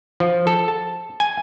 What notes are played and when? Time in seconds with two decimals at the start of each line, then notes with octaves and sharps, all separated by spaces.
0.20 F3
0.47 A4
0.68 A5
1.20 G#5